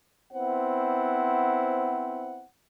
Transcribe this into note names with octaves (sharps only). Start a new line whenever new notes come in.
B3 C4 E4 C5 F#5